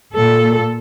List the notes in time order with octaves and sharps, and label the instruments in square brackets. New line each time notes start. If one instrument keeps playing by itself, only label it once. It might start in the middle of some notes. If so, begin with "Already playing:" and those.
[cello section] A#2 A4